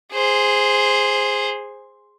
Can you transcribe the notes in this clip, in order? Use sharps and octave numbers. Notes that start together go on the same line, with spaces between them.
G#4 C5